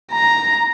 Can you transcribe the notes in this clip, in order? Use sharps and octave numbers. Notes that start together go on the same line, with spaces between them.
A#5